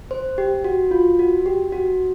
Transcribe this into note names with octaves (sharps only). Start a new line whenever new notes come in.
C5
G4
F#4
F4
F#4
G4
F#4